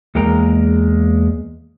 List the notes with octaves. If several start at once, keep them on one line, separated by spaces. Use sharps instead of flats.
E2 G#3 A#3 A#4 G5 A#5